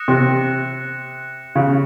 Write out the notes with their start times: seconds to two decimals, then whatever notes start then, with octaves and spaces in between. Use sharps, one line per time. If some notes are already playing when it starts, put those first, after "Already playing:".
Already playing: D#6 F#6 A#6 C#7 E7
0.08 C3
1.55 C#3